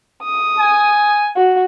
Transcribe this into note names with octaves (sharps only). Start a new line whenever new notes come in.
D#6
G#5
F#4